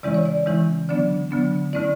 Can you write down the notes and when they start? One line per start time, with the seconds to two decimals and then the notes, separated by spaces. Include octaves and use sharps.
0.03 C#3 E3 G#3 C#4 E4 D5
0.14 C#5
0.25 D5
0.46 C#3 E3 G#3 C#4 E4
0.89 D3 F#3 B3 D4 D5
1.31 D3 F#3 B3 D4
1.73 D3 A3 C#4 E4 D5